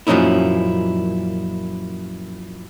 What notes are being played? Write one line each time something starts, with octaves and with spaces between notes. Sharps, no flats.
F#2 A#2 F3 C#4 D#4 E4